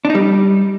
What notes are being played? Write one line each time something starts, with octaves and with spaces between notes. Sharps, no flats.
D4
D#4
G3